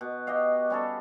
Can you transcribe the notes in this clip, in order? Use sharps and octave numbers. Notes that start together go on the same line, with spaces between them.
B2
F#4 G4 D#5 F5
G3 C#4 A4